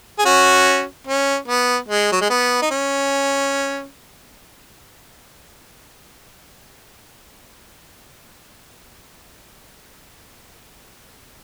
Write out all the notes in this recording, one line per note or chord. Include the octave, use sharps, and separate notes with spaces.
G#4
C#4 F#4
C#4
B3
G#3
F#3
G#3
B3
D#4
C#4